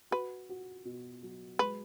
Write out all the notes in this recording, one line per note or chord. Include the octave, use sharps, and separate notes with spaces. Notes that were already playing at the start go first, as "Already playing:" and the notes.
F#4 B4
F#4
B2
F#3
G#3 B4